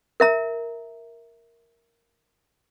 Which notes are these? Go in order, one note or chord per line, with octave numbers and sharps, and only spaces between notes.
A#4 E5 A#5